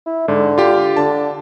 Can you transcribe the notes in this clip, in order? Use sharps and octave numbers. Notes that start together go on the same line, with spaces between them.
E4
G#2 D3
F4 G4
D3 A5